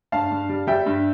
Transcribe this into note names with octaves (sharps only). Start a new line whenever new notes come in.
G2 F5 A5
G2
G3
G3 E5 G5
G2